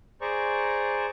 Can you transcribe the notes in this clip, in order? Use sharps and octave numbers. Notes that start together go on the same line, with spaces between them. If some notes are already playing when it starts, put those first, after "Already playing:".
G#4 C5 D5 A#5 C#6